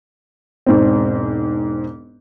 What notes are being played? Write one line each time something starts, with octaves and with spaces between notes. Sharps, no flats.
E1 G#2 C4